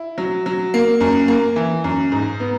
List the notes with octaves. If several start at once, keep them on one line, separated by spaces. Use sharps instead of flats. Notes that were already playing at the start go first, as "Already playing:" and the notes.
Already playing: E4
F#3
F#3
A#3
F#2
A#3
E3
F#2
G#2
B3